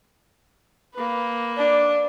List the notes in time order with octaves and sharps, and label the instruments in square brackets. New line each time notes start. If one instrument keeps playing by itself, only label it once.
[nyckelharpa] A#3 B4
[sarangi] D4